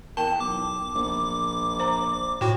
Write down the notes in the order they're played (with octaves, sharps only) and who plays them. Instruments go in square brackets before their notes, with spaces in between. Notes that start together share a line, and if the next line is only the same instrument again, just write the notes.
[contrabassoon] E2 [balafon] A#4 G5 [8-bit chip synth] A5
[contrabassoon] B1 [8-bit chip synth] D6
[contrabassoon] A#1
[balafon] C5 A#5
[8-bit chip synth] A2 F#4 [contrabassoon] F3 [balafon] G5